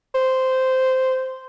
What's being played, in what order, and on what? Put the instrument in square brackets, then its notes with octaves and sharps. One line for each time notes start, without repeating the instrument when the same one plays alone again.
[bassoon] C5